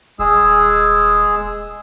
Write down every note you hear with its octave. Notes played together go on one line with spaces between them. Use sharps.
D#1 G#3 G#4 E6